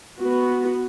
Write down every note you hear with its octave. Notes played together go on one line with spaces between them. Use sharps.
B3 F#4